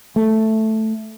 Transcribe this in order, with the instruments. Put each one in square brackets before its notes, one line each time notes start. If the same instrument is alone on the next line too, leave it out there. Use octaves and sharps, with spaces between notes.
[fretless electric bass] A3